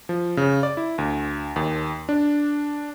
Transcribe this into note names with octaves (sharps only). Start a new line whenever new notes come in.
F3
C#3
D5
E4
D2
D#2
D4